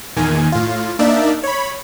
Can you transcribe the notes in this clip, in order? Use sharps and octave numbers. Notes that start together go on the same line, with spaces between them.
E2 A#2 D#3 G#5
A2 F4
A#3 D4 D#4 D5 E5
C#5 B5